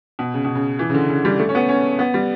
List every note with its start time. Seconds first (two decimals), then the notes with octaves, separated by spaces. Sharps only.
0.19 B2
0.34 C#3
0.45 B2
0.55 C#3
0.79 E3
0.89 C#3
0.94 D3
1.09 C#3
1.25 G3
1.39 A3
1.49 C#4
1.55 B3
1.69 C#4
1.99 B3
2.14 G3